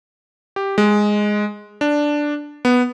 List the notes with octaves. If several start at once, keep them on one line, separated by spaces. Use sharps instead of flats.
G4
G#3
D4
B3